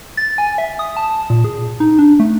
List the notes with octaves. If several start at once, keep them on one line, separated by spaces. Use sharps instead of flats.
A6
G#5
E5
D#6
A5
A#2
G#4
D#4
D4
A3